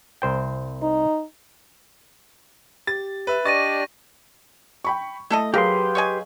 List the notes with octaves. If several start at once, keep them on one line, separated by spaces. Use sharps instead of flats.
C2 C5 G5
D#4
G4 A6
B4 E5
D4 G4 D5 D#5 C#6 A6 A#6 D#7
G5 B5 C#6
A3 E4 A4 D#5
F#3 G4 G#4 A#4 B4 F5 C6
C#5 D#5 G#5